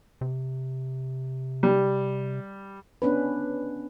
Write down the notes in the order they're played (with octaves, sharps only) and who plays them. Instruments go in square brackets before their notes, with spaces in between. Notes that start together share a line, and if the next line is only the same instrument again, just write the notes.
[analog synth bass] C3
[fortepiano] G3
[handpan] B3 C#4 D4 B4